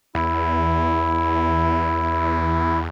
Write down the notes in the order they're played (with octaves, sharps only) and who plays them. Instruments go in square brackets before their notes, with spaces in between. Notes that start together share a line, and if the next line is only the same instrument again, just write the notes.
[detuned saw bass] E2 [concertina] E4